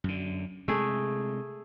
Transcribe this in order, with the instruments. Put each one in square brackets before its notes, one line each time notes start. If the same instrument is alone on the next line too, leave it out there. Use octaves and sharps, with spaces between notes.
[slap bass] F#2 D3
[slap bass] C3 G#3 [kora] A3 G#4